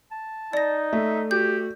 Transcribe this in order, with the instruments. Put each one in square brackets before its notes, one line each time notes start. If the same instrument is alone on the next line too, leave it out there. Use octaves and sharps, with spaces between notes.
[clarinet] A5
[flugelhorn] D#4 [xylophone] D5 A#6
[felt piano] A3 [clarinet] E5
[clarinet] F#4 [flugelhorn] G4 [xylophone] G6